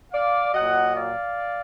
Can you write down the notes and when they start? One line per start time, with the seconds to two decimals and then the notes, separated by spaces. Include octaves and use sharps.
0.12 D5 F5
0.54 A#2 F#3 D#5 F#5
0.96 D5 F5